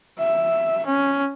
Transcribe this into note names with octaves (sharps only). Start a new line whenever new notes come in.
E5
C#4